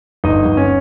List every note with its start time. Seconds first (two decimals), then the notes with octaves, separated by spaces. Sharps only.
0.24 G1 D#4 D#5
0.45 G1
0.57 C#4 C#5